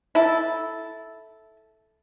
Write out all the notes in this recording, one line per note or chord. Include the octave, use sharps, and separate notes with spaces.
E4 A4